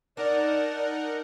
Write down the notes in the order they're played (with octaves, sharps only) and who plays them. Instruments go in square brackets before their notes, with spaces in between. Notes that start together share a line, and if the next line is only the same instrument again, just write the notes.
[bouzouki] D4 [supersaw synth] D#4 A#4 F#5 [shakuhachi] D5